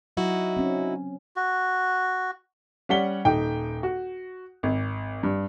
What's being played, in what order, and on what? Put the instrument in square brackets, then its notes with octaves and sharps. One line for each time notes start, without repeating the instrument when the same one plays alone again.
[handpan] F#3 [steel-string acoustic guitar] D#4 E4 F#4
[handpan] C4 C#4
[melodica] F#4
[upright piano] G3 C#4 F#5 B6 G7
D#1 D#4 G5
F#4
G#1
G2